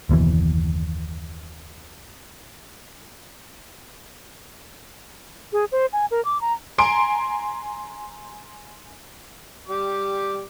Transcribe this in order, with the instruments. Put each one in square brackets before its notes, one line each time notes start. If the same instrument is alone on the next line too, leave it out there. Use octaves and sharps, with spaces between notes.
[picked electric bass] F#1 D#2 B2 E3
[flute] G#4
C5
G#5
A#4
D6
A#5
[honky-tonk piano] G#5 A#5 C6 D7
[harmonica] G3 D6